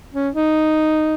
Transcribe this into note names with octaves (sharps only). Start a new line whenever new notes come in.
C#4
D#4